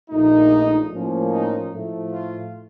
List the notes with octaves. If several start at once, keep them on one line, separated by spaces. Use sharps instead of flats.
A#1 A#2 A3 D#4
A2 F3 A#3 C#4
D#4
A2 F3 A3
F4